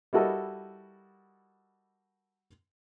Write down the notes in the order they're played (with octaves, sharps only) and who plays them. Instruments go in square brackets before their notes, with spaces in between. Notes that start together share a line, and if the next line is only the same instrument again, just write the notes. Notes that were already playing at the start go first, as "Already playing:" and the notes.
[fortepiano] G3 E4 F#4 A4 A#4 D#5